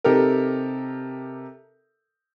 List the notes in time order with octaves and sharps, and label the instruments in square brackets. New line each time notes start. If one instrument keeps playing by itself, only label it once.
[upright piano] C3 D#4 G4 A4 A#4